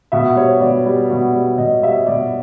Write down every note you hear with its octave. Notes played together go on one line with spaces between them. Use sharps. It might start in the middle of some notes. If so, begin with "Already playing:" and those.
B2 E5
G3 C#5
B2 D5
G3
B2
G3
B2 D#5
G3 E5
B2 D5